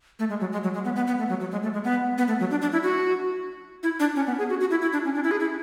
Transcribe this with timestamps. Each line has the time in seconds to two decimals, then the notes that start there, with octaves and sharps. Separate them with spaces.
0.19 A3
0.29 G#3
0.40 F#3
0.52 G#3
0.64 F#3
0.74 G#3
0.85 B3
0.96 B3
1.07 B3
1.19 A3
1.29 F#3
1.40 F#3
1.51 G#3
1.63 A3
1.73 G#3
1.84 B3
2.18 B3
2.28 A3
2.40 F#3
2.51 D4
2.62 D4
2.72 E4
2.83 F#4
3.83 E4
4.00 D4
4.16 C#4
4.27 B3
4.38 G#4
4.49 F#4
4.60 F#4
4.71 E4
4.82 E4
4.93 D4
5.05 C#4
5.15 D4
5.24 E4
5.31 G#4
5.40 E4